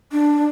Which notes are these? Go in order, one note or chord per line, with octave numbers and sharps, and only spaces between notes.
D4